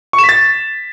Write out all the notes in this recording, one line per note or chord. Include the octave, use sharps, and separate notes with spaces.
C#6
E7
B6
A6